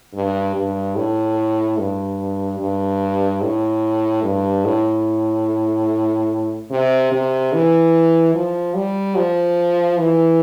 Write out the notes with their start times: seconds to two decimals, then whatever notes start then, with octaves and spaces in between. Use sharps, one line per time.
0.15 G2
0.55 G2
0.96 A2
1.78 G2
2.60 G2
3.42 A2
4.24 G2
4.65 A2
6.71 C3
7.12 C3
7.53 E3
8.35 F3
8.75 G3
9.16 F3
9.99 E3